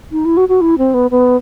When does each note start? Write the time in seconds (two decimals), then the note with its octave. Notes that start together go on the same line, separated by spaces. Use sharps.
0.12 D#4
0.25 E4
0.37 F#4
0.49 F#4
0.61 E4
0.78 C4
0.94 B3
1.11 B3